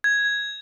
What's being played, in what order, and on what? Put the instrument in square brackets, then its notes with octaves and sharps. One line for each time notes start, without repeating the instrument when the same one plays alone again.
[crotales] G#6